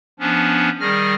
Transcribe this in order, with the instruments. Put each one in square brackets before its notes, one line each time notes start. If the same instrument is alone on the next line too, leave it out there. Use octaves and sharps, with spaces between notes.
[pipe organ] F3 B3 C#4 D4
D#3 G3 G#4 F6 A#6